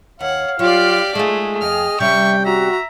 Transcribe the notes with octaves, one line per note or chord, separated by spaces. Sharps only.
D#2 C#5 F5 F#5
F#3 F4 G4 D5
G#3 A3 D#4 F4 G#4
F2 D#5 F6
C3 G3 C#4 E5 G5 C#6
F#4 E5 A#5